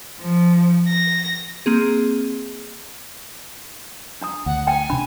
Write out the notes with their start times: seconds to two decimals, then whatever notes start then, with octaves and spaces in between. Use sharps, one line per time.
0.22 F3
0.88 A#6
1.66 A#3 C4 G#4
4.21 D4 A#5 D#6
4.46 D2 F#5
4.67 G5 G#5 A#5
4.90 C3 D4 B5